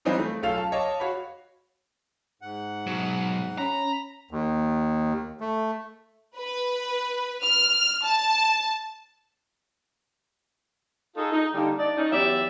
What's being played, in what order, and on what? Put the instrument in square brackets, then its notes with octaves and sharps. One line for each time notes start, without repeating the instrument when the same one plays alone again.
[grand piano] E3 G3 C4 C#4 D#4 F4
A3
B1 C#4 F4 A4 F5 F7
A5
C#5 D#5 F5 A5 D6
F#4 C#5 F5 B5
[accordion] G#2 F#5
[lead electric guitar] B2 F#3
[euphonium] C#4 [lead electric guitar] A#5 [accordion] B5
[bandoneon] D#2
A3
[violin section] B4
F6
A5
[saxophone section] D#4 F4 G#4 A4
D#4
D3 G3 A#3 D#4
D4 D#4 D5
C#4 D#4
E2 F#3 G4 D5 E5